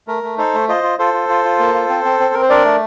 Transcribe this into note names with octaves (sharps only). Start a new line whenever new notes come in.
A3 A#4
A3
D#4 A4 C5
A3
F4 C5 D#5
F4
F4 A4 C5
F4
F4
F4
A#3
F4
C4
C4
C4
C4 A#4
C5
D4 A#4 D5
A3